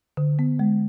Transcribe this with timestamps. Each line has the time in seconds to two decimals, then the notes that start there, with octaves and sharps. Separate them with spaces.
0.17 D3
0.39 B3
0.59 G#3